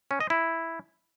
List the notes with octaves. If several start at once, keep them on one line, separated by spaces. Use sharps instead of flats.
C#4
D#5
E4